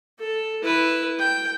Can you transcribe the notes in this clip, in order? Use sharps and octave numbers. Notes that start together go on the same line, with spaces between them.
A4
E4 B4
G5